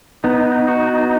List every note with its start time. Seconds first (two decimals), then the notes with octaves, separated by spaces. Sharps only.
0.24 B3 D#4
0.68 F#4